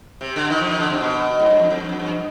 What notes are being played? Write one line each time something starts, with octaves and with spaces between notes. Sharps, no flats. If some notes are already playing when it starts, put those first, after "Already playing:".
C3
D3
D#3
F3
D#3
D3
C3
B2
G#2
G2
F2
F2
G2
F2
G2